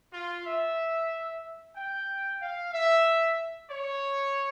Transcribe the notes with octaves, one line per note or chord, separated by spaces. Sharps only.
F4
E5
G5
F5
E5
C#5